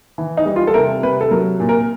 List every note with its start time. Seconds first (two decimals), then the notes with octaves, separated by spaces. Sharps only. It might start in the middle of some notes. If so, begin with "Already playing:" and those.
0.18 E3
0.37 D#4
0.46 G3
0.56 F4
0.67 A4
0.74 C3 A#4
1.03 C3 B4
1.21 A4
1.31 F#3 A#4
1.60 A#2
1.69 A#4